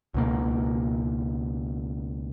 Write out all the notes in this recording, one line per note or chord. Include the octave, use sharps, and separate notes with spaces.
C#2 B2 A#3